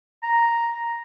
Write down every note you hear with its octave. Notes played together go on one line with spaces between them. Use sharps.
A#5